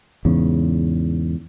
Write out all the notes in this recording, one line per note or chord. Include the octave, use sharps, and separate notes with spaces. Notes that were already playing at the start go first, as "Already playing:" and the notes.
E2 G#2 C#3